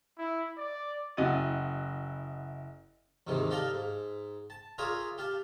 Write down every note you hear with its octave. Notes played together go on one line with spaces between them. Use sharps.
E4
D5
F#1 E4 D#5 F#5 A6 D#7
D#2 G#2 C3 D#3 E3
D#4 G4 A4 A#4 D5 F5
G#2
A5
F4 G#4 A#4 C#5 D5 E5
G4 F5 A5